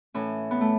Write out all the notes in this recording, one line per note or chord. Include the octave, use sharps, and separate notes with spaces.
A2 E3 C#4
B3
A3